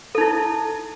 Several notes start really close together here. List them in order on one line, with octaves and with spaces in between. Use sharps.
A4 D#4 E4